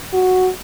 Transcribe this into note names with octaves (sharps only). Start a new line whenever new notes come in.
F#4